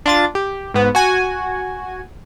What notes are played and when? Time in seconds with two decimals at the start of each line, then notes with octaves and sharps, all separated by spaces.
0.06 D4 F4 A6
0.35 G4
0.74 G#2 B3
0.95 F#4 G#5